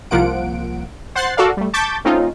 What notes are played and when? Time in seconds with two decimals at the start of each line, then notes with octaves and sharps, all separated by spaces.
0.11 C2 F3 A#3 F4 F#5 D7
1.15 C5 F#5 C6 F#6 A6 C7
1.37 F#4 A4 A#4 D5 F5
1.57 G3 A3
1.73 A5 C#6 D6 G6 A6 B6
2.05 A3 C4 C#4 D#4 F4